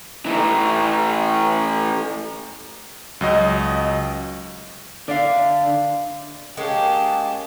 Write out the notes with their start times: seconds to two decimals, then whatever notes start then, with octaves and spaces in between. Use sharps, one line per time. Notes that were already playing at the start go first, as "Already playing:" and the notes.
0.26 E3 A3
3.21 C#2 F#3 D#5
5.08 D3 D5 E5 F5
6.57 G#3 A#3 C#4 G4 A5